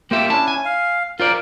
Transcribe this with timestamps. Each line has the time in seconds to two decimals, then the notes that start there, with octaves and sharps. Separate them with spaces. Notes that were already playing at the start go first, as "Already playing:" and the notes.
0.11 A#3 F4 G4 E5 G5
0.30 C#4 D4 E4 A5
0.48 G#5
0.65 F5
1.20 F4 A#4 C5 D5